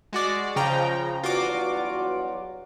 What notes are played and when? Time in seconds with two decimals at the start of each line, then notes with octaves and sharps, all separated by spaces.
0.13 G#3 F#4 D5
0.56 C#3 F3 G5 A#5
1.24 E2 G2 F#3 F4 F#4 D6